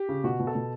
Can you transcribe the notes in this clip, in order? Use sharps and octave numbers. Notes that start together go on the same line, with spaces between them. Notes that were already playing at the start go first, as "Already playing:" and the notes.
Already playing: G4
C#3
B2 F#4
B2
A4
B2